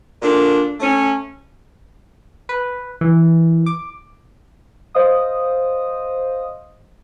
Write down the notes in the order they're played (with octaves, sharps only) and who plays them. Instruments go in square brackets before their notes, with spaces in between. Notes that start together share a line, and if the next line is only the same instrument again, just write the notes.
[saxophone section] A#2 D3 D4
A3 C#4
[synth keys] B4
E3
D6
C5 D#5 F5 D#6